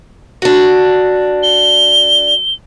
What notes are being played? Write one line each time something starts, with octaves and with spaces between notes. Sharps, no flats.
D4 F#4
G7